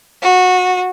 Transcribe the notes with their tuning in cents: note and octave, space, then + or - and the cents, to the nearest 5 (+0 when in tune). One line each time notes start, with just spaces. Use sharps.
F#4 -20